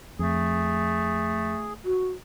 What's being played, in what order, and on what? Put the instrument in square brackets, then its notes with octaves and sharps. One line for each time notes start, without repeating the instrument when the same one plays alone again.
[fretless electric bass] F2 [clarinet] A3 [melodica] G#4
[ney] F#4